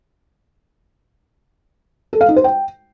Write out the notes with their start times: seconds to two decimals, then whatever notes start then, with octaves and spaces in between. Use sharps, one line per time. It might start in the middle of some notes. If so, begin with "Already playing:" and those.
2.13 A4
2.21 F5
2.29 D#4
2.36 C5
2.44 G5